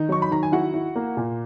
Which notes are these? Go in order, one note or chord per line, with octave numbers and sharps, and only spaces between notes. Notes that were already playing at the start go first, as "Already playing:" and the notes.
Already playing: D#3 D#4
F#3 C#6
B5
D#3 A#5
G#5
E4 F#4 F#5
E4
A#3
A#2